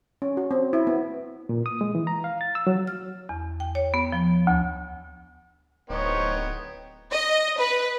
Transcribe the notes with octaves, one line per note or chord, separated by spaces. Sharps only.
C#4
F#4
C4
E4
B3
A#2
D#6
G#3
E3
A#5
F5
A6
E6
F#3
F6
E2
G5
C#5
B3
F3
D2
D1 B3 D#4 C5 C#5 G5
D#5
B4